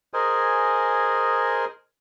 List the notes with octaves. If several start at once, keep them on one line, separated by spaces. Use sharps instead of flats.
G#4 A#4 C5 D#5 G#5